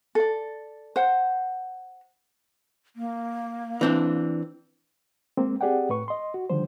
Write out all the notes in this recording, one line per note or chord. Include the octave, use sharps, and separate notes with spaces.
A4 D5
C5 F#5
A#3
E3 C4 D4
G#3 A#3 C4
C4 G4 G#4 D5 F#5 G5
A2 B4 C#6
D#5 C6
F#4
D3 D#3 F3 G3 C5